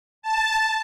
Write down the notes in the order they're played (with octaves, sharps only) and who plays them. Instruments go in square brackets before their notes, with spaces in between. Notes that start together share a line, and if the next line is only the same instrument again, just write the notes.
[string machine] A5